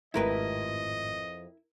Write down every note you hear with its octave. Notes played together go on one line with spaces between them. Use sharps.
G#1 F2 A2 E4 G4 A#4 B4 D#5